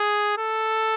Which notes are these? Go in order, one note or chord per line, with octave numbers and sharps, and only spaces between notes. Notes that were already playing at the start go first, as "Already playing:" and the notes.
Already playing: G#4
A4